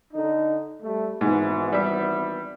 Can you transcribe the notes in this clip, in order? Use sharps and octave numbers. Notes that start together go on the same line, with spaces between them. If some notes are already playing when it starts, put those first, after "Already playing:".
D3 D#4
G3 A3
G#1 G#2 E3 B3
G3 E5